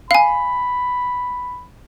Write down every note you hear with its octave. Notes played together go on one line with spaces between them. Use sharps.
F5 G#5 B5